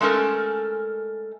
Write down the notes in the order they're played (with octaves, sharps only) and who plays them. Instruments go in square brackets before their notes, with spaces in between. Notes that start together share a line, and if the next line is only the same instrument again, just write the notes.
[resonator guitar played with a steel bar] G#3 A3 C#4 A4 A#4